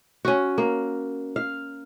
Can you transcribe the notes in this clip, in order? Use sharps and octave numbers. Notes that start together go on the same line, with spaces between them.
C#4 F#4
A#3
F5